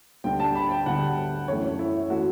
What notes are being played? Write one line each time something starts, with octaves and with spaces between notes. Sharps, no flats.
D2 D3 G3 G5
A5
B5
G5
D2 D3 G3 F#5
F#2 E3 A3 C#5
C#5
E4
E3 A3 F#4